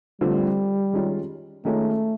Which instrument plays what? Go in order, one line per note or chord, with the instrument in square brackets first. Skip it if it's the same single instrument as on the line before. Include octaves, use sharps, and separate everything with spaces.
[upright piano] D3 F3 A3 C4 F4 [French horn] G3
[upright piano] D#3 G#3 C#4 F4
[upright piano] D#3 G#3 C#4 F4 [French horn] A3